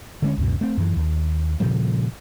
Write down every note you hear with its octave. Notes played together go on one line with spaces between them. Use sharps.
D3 G#3 C#4
C#2 F#2 B2
A3 C4
F#2 E3
D#2
A#2 C#3 F3 G3